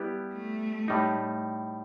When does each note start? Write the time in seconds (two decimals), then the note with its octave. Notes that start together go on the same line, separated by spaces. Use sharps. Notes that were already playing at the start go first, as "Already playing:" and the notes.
Already playing: G3 B3 E4 G4 B4
0.33 A3
0.88 A2 G3 D#4